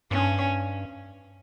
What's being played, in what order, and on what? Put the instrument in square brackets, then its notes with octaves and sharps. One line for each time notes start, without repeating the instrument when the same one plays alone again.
[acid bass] G2 [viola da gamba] C#4